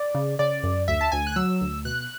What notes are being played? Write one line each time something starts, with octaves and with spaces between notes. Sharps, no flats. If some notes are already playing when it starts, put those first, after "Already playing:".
Already playing: D5
C#3
C#3 D5
F#2
D2 E5
A5
D2 G#5
F#6
F#3 E6
D2
B2 F#6